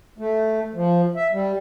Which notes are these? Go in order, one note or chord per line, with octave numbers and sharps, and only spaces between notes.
A3
F3
E5
G3